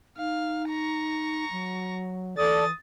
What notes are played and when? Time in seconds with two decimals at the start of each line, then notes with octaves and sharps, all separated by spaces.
0.17 D#4 F5
0.69 A#5 C#6
1.51 F#3
2.38 E3 A4 D5 D#6 A6